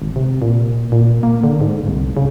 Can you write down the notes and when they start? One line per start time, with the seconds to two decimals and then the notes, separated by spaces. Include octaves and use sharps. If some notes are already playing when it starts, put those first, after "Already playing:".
0.02 G#1
0.16 C3
0.42 A#2
0.92 A#2
1.23 A#3
1.44 D3
1.61 G#2
1.88 C2
2.17 C#3